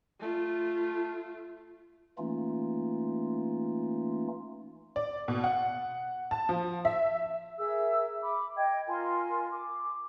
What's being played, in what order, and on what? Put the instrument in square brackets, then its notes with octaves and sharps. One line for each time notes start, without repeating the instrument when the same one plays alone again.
[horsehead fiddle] A3 F4
[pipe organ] E3 A3 A#3 C#4 D#4 F4
[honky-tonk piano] D5
B2
F#5
A5
F3
E5
[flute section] G#4 A#4 E5 E6
B5 D6
D#5 G5 G#6
F4 A#4 G#5 C6
D6